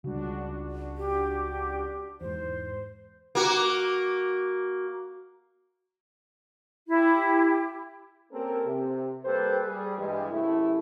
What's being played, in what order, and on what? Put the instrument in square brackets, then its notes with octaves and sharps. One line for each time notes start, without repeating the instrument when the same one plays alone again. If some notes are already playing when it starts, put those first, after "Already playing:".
[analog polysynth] C#2 D4 F#4 [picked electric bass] C#3 G3
[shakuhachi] G4
[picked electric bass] E2 G#2 [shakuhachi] C5
[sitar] A#3 F#4
[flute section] E4 G4
[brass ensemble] A#3 C4 C#4 G4 A4 A#4
C3
G3 A#3 G4 A4 B4 C5
G3 G#4
G2 E3 G#3
F#2 C3 A3 E4